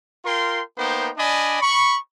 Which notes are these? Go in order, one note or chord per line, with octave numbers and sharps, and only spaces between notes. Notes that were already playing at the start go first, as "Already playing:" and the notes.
F4 A#4 G5 C6
A#3 B3 D#4 C5 G5
D4 D5 D#5 G#5 B5
B5 C#6